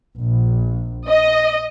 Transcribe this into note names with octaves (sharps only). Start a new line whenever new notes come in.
A#1
D#5